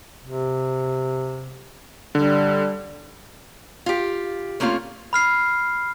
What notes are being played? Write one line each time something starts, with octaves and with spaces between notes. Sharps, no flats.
C3
D3 G3
F4 G4
A3 A#3 C4 C#4 F4
B5 F6 C7